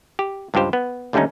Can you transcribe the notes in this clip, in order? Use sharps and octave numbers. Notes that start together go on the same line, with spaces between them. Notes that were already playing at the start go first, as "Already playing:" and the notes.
G4
C#2 G2 F4 G4 C5
B3
D#2 D3 G3 A3 C#4 D#4